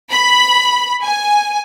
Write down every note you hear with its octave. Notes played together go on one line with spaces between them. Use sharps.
B5
G#5